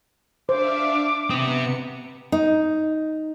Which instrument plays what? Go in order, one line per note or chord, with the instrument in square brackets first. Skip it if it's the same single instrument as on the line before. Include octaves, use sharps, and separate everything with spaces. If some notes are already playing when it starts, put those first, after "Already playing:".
[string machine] D4 E5 F5 [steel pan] C5 [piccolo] D6
[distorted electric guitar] C3 C4 [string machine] B3 C#7 [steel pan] D#6
[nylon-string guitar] D#4